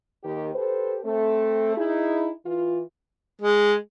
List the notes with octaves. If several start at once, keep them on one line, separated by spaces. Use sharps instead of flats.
D#2 D#3 G4
G4 A4 B4 C5
A3 C4 A4
D#4 E4 G#4
E3 F4
G#3